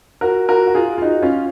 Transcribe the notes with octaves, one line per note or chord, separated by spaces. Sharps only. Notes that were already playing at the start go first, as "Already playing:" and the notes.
F#4 A#4
F#4 A#4
F#4
F4 G#4
F4
D#4 F#4
C#4 F4